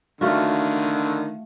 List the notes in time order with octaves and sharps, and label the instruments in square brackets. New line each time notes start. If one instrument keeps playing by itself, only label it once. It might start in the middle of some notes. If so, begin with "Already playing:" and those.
[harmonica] D3 D#3 [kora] A3 F4 F#4